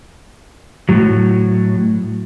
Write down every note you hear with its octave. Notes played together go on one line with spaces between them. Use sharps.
A2 F#3